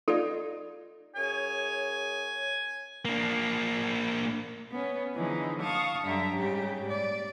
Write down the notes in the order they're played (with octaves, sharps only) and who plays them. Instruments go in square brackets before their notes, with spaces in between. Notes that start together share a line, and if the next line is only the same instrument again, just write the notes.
[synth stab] D#4 F4 [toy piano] A4 D5
[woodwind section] F#2 G#4 C#5 [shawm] G#5
[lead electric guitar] A#3 D4
[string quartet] B3 C#4
D3 E3 F3 G#3 D#4
F5 A5 C#6 D#6
F#2 D3 G3 E5 A#5
G#2 C#3 G3 G4
D5